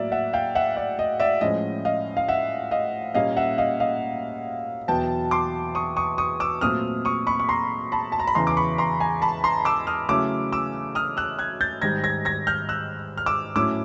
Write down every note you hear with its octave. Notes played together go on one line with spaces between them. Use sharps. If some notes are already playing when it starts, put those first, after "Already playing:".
Already playing: A2 F#3 A#3 D5 E5
E5 F#5
F5 G5
E5 F#5
D5 E5
D#5
D5 E5
A2 F3 G#3 C#4 D#5
D#5 F5
F5
E5 F#5
D#5 F5
A#2 G3 A#3 C#4 D#5 F5
E5 F#5
D#5 F5
D#5 F5
E2 B2 F#3 B3 G5 A5
C6 D6
C#6 D#6
C#6 D#6
C#6 D#6
D6 E6
A#2 F#3 A3 C4 D#6 F6
C#6 D#6
B5 C#6
C#6
A#5 C6
A5 B5
A5
A#5
B5
E2 C#3 E3 A#5 C6
D6
B5 C#6
A#5 C6
G#5 A#5
A5 B5
A#5 C6
D6 E6
D#6 F6
C#3 F#3 A3 C#4 E4 D6 E6
D6 E6
D#6 F6
E6 F#6
F#6 G#6
G6 A6
G#2 D#3 G3 G#6 A#6
G#6 A#6
G#6 A#6
F6 G6
E6 F#6
F6
D6 E6
A2 F#3 A3 C#4 E4 D6 E6